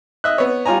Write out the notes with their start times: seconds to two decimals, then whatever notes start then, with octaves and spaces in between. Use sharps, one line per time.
0.24 D#5 E5 F#6
0.38 B3 C#5
0.66 G3 F4 C#5 G#5 A#5